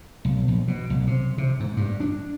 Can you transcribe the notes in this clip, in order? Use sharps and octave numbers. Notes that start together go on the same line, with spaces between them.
B1
A#1
B2
B1
C3
C3
G#2
G2
D4